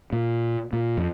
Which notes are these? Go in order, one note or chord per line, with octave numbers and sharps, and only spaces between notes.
A#2
A#2
F2